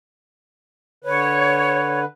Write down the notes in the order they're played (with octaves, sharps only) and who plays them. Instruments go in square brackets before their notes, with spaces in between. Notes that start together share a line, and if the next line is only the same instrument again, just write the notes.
[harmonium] D3 B4 [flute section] C#5